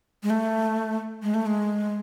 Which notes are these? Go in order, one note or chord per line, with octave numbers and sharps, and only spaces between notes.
G#3
A3
G#3
A3
G#3